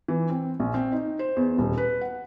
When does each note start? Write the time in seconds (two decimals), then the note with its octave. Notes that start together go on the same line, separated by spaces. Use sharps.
0.08 E3
0.30 C4
0.60 A#1
0.74 C4
0.92 D#4
1.19 C5
1.36 E2
1.58 D#1
1.77 B4
2.01 F#5